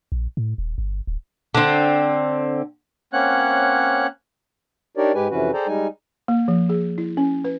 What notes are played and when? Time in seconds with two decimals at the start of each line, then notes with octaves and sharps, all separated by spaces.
0.12 A#1
0.37 A2
0.58 D#1
0.78 G1
1.07 D1
1.55 D3 C4
3.13 A#3 C4 C#4 C#5 F#5 F#6
4.97 D4 D#4 G4 A#4 C#5 D5
5.15 G#2 G#3 G4 B4 G#5
5.30 F2 C3 E3 C#4 F#4 B4
5.54 G#4 A4 C5 D5 G5 A#5
5.67 G3 G#3 D#4 G#5
6.28 A#3
6.48 F3
6.69 G#4
6.98 E4
7.17 C#4
7.45 B4